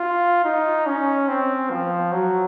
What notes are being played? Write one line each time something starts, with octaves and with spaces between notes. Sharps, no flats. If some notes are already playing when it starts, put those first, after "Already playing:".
Already playing: F4
D#4
C#4
C4
F3
F#3